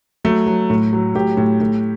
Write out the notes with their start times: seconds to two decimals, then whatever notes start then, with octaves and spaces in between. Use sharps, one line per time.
0.24 F#3 A3
0.47 F#3
0.70 A2
0.93 F#3
1.15 A2 G4
1.37 A2
1.60 A2